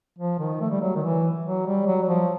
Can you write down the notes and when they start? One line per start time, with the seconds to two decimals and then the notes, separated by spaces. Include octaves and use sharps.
0.18 F3
0.39 D#3
0.61 A3
0.71 G3
0.81 F#3
0.95 D#3
1.03 E3
1.45 F#3
1.66 G3
1.87 F#3
2.03 F#3
2.08 F3